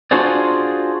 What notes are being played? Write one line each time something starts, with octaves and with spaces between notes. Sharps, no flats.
D4 F4 F#4 G#4 C5 D5